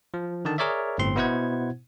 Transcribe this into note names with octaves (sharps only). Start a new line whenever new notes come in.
F3
D3 D#3 A5
G#4 A#4 C#5 D5 E5
G1 A2 C4 C6
B2 B3 E4 C5 F#5 G#6